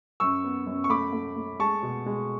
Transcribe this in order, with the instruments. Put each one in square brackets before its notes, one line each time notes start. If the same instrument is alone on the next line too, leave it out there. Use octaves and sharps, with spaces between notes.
[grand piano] F#2 C#6 E6
B3
F#2
C#6
A3 B5 D6
A3
A3
G#3 A5 C#6
B2
G#3